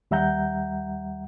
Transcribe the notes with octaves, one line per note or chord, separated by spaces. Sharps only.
D#2 G3 E5 F#5 A#5 G6